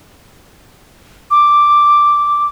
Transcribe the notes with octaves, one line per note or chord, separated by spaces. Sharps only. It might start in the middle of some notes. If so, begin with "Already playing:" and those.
D6